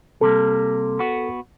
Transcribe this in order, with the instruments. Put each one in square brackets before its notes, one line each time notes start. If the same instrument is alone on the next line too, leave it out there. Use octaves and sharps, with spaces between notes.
[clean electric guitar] C3 G3 A#3 [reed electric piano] A4
[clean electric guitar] B3 F#4